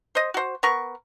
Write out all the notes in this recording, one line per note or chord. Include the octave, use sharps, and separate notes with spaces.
C5 D#5
F#4 C5
B3 A#4 C#6